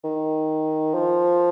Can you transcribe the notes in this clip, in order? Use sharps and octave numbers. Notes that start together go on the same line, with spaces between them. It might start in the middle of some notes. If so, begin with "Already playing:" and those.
D#3
F3